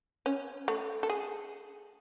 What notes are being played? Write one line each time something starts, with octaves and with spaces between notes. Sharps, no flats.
C#4
A3
A4
G#4